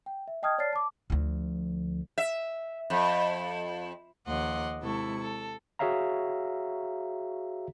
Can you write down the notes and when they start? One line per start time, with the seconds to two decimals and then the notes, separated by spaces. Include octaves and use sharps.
0.06 G5
0.28 E5
0.43 D#5 G5 A5 D#6 F6 G#6
0.58 C#5 D5 A5 F6 A6 C7
0.73 A5 D6
1.10 D2 F3
2.18 E5
2.90 F2
4.26 D#2 F3 D#5 F#5 C6 D6
4.81 C3 G#3 E4 A4 C#6
5.20 A4
5.79 F#4 G#4 C#5 E5 F5 A#5